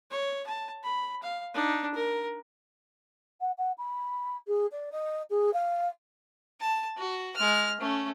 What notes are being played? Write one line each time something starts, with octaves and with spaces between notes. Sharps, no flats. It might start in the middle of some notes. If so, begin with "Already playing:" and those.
C#5
A5
B5
F5
D4 D#4
A#4
F#5
F#5
B5
G#4
D5
D#5
G#4
F5
A5
F#4
G#3 F6
A3 C#4